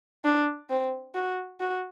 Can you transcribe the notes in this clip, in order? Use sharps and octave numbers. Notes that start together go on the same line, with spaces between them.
D4
C4
F#4
F#4